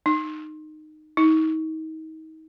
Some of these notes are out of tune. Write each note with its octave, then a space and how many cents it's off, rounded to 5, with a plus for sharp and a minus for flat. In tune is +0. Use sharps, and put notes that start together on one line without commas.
D#4 -15
D#4 +35